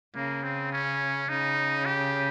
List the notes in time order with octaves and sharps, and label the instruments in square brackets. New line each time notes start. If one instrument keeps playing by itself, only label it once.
[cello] C#3 [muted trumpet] A#3
[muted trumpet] C4
C#4
[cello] C#3 [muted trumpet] D#4
[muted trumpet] G4